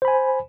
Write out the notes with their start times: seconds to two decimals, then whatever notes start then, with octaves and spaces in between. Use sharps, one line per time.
0.02 C5
0.05 B5
0.08 G#5